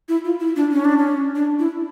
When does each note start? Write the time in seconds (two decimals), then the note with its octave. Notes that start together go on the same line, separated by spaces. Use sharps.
0.09 E4
0.24 F4
0.40 E4
0.56 D4
0.72 C#4
0.85 D4
0.98 C#4
1.35 D4
1.59 E4